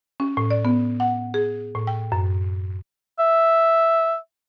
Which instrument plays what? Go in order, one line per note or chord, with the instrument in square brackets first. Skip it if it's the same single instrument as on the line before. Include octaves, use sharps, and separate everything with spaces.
[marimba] C#4
A2
D5
B3
F#5
G#4
A2
G5
F#2
[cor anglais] E5